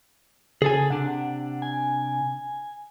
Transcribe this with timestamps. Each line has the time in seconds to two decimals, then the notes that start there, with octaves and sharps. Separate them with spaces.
0.62 C#3 G#4 A4 G#5
0.90 C3 D4 F#5
1.62 G#5